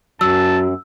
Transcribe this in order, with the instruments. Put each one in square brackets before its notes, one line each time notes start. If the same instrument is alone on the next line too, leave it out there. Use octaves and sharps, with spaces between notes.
[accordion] F#2 [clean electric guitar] F#3 [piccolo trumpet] A5 [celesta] E6